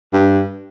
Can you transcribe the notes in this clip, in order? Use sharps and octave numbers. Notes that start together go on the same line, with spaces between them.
G2